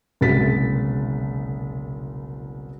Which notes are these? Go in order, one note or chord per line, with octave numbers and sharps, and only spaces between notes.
F#1 C2 B2 G#3 A6 B6